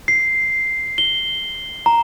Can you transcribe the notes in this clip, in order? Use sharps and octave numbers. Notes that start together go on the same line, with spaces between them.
C7
G7
A#5